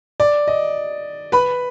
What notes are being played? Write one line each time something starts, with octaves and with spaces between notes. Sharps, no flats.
D5
D#5
B4 B5